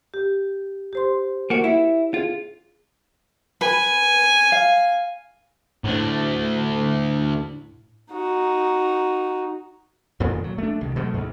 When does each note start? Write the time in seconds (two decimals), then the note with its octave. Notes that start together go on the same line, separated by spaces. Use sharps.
0.14 G4
0.93 G4 C5 C6
1.50 A#3 F#4
1.64 E4
2.14 F4 G#4
3.61 B4 G#5
4.52 F5
5.84 D2 A2 D4
8.12 D#4 F#4
10.20 F2 A#2 D#3 F3
10.44 F#3
10.58 A3 D4
10.81 C2 D#3
10.96 B2 F#3 G#3 A3
11.14 D2 G#2